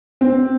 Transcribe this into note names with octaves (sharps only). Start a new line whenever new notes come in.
C4